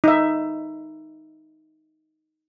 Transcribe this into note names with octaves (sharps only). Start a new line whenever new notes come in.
D#4 E5